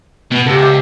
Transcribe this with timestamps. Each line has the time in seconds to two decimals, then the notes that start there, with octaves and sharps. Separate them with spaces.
0.32 B2 B3
0.46 C#2 G4 A4
0.59 G4 E5